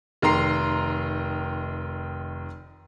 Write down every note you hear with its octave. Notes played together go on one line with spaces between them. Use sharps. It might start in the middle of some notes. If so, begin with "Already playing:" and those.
F1 D#3 A#5 C6 C7